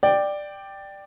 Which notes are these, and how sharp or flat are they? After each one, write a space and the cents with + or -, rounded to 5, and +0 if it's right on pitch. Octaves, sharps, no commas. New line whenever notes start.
D5 +10 G5 +0